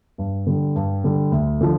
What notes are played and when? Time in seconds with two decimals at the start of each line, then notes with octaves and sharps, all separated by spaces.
0.18 G2
0.47 D3 G3
0.76 G2
1.04 D3 G3
1.32 D2
1.61 D3 F3